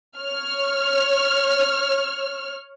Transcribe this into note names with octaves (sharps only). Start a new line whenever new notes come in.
C#5 F6